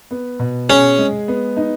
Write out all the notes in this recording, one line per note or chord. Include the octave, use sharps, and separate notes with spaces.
B3
B2
C#4 G#4
G#3
B3
D#4